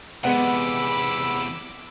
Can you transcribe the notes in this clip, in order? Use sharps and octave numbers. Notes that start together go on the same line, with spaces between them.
E2 C3 G#3 B3 F#5 B5 D6 E6